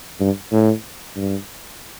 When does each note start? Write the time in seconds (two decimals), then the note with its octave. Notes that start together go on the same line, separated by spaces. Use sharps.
0.20 G2
0.52 A2
1.16 G2